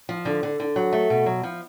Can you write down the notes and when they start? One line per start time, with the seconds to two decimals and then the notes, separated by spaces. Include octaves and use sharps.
0.09 F3
0.25 D3
0.43 D3
0.60 D3
0.76 F#3
0.92 A3
1.10 B2
1.26 F#3
1.43 F3